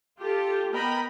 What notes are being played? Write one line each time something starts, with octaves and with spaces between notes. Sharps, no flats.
F4 G4 A4
B3 A#4 D#5 G5 A#5 B5